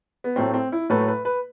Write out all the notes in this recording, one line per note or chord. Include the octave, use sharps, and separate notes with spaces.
B3
A2 F#3 A3 C4
C4
E4
A2 F#3 A3 B4
B4
B4